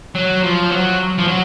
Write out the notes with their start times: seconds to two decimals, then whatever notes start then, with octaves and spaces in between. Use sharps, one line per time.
0.15 F#3
0.43 F3
0.71 F#3
1.18 F3
1.28 F#3